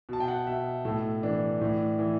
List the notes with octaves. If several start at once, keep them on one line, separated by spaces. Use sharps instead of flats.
B2 A5
G5
F#5
B2 E5
A2 A4
E3 D4
A2
E3